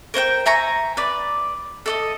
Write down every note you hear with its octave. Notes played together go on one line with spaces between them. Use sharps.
A#4 C5 F#5 G5
E5 G#5 A#5 C#6
B4 D5
A4 D5 D#5